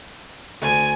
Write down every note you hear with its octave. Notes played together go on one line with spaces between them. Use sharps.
D2 G#5